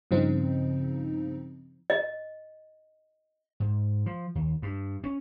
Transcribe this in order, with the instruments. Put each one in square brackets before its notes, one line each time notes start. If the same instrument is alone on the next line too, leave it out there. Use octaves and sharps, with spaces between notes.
[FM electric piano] G2 C#3 F3 C4 D#4
[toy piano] D#5
[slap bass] G#2
F3
D#2
G2
C#4